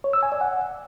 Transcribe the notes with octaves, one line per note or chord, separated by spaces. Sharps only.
C#5
E6
G#5
D5
F#5